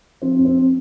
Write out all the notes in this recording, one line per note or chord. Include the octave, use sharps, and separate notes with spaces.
F3 C4
F2
C4